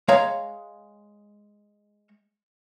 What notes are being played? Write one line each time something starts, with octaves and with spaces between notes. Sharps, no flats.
G#3 C#5 F5 A#5